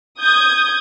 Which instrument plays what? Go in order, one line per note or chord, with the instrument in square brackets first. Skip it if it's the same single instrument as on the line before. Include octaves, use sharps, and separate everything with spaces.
[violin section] D#6 G6 G#6